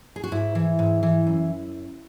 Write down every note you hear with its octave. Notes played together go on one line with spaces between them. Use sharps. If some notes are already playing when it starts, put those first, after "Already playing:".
G#4
F#4
G#2 E4
E3
G#2
E3
F#2